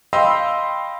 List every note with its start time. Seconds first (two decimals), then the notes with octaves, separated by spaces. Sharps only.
0.13 D#5 F5 G5 B5 C6 E6